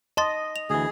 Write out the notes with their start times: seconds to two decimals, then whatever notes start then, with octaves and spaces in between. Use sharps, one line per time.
0.17 D#5 A5 C6 A6
0.56 F7
0.70 D2 E3 G#4